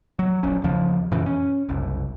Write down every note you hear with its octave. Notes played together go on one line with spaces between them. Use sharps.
F#3
D#1 A#1 C#4
D#2 C#3 F3
F#2 A#2 C#3 E3
C#4
F#1 C2